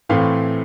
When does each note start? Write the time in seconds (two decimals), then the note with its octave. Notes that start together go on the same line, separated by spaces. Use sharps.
0.09 A2 E3 A3 C4 F5